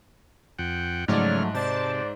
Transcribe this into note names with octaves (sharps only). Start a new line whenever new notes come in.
F2 F#5 G5
G#2 C#3 F3 F#3 A3 C#5 D5 F6
C3 C5 D5 A5